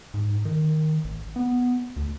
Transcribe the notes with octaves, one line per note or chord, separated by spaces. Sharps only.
G#2
D#3
A1
B3
D2